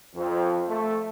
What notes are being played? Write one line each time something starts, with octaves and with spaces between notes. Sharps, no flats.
F2
A3